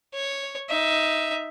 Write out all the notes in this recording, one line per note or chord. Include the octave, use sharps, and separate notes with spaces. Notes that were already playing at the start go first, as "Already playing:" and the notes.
C#5
D#4 E5